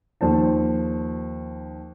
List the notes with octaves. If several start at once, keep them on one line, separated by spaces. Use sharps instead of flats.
D#2 F3 C5 A5